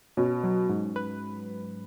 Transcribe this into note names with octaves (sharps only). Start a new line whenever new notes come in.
B2 C#4
F#3
G#2
B4